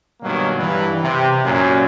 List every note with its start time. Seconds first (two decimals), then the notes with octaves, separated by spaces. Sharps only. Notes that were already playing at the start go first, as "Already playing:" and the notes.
0.22 G2 B2 D#3 F#3 A#3
0.58 G2 E3
1.02 C3
1.44 F#2 A#2